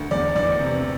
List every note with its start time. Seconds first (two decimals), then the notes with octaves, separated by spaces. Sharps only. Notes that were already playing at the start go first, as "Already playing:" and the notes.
Already playing: D2
0.11 E2 D5
0.36 E3 D5
0.60 C3